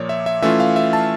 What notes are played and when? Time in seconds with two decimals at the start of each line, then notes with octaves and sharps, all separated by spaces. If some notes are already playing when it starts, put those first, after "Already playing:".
Already playing: A#2 F3 A#3 C#5 D5
0.09 E5
0.26 E5
0.42 E3 A3 C#4 F4 E5
0.60 F5
0.76 E5
0.93 A5